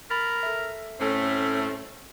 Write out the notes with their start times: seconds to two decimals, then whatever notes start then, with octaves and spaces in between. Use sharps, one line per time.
0.10 A#4 B5 A6 B6
0.43 A4 E5
1.00 A2 A3 C4 C#4